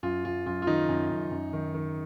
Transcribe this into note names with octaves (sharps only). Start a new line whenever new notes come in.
F#2 F4
F#2 F4
F#2 F4
F4
D#3 D#4
F#2
F#2
F#2
D#3
D#3